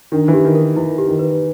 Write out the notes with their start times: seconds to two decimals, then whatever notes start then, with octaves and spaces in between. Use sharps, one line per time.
0.12 D#3 D4
0.28 E3
0.33 G4
0.45 D#3
0.55 A#4
0.76 E3 E4
0.98 G4
1.08 D#3
1.19 B4